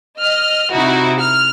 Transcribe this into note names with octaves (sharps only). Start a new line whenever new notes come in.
D#5 F6
C3 D#4 E4 F#4
F6